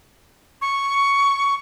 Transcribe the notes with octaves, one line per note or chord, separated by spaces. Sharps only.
C#6